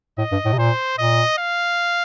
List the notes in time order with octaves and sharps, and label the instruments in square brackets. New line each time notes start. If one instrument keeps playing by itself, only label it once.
[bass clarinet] A2 [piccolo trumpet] D#5
[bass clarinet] G2
A2
C3
[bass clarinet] A#2 [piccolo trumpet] C5
[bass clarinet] A#2 [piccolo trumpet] D#5
[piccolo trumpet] F5